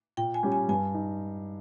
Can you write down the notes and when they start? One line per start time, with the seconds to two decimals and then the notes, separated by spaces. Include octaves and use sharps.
0.17 A#2 G5
0.34 G#5
0.43 G3 C#4 G4
0.52 G#5
0.69 G2 G#5
0.94 D#4